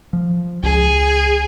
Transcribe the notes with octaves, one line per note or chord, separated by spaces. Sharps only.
F3
C#2 G#4